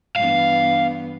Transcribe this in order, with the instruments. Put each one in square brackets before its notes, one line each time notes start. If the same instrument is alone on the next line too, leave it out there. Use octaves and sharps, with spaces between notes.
[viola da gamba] G2 E3 B3 [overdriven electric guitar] F5